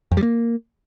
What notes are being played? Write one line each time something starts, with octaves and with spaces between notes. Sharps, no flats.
F2
G3
A#3